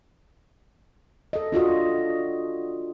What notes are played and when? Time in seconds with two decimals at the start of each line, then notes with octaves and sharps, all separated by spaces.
1.33 A4 D#5
1.52 D4 F4 F#4 D#5